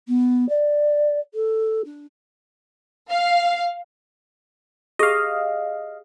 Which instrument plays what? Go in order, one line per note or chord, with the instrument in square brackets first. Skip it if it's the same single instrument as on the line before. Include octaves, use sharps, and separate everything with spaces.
[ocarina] B3
D5
A4
D4
[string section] F5
[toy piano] G4 G#4 [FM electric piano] D#5 F5